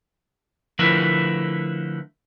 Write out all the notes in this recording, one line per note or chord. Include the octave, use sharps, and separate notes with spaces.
D3 F3 A3 E4 A#4 B4